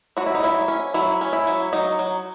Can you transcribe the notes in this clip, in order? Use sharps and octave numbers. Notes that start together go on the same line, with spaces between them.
F#3 F#4
E4
D#4
F#3 E4
C#4
F#3 E4
C#4
E4
F#3
F#3 D#4
F#3